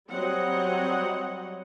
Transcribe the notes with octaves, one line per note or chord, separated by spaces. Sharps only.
F#3 G3 C4 C#5 D#5 F#5